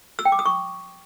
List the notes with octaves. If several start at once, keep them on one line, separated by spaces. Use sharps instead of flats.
E6
G5
D6
D#6
C#6